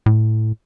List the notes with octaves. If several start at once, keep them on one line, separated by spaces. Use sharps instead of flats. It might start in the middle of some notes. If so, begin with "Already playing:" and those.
A2